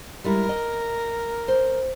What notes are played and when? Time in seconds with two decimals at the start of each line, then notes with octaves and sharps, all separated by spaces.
0.24 G3 G#3 E4 A#4
0.49 D#5
1.48 C5